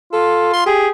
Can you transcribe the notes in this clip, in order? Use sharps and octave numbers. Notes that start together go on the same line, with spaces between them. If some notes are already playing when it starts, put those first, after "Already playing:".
F4 A4
C6
G4 G#4